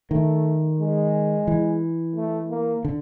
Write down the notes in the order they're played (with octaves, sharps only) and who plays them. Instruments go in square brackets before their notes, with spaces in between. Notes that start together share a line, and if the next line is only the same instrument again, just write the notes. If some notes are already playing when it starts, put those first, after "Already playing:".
[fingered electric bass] D#3 [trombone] A3
[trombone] G#3
[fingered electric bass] E3
[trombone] A3
A#3
[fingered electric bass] D3